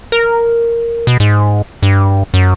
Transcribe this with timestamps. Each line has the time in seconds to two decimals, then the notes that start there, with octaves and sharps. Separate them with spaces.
0.12 A#4
1.07 B2
1.20 G#2
1.83 G2
2.34 F#2